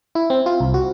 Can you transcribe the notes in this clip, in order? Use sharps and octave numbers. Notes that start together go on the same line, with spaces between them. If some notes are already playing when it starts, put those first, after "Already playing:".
E4
C4
F4
C2
F#4